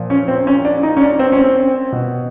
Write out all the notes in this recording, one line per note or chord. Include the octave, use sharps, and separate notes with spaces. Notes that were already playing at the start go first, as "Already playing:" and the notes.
Already playing: A#2 F3
C#4
C4
C#4
D4
D#4
C#4
D4
C4
C#4
C4
B2